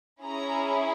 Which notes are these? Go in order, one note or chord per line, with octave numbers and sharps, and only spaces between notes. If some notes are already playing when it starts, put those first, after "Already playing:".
C#4 E4 G#4 A#5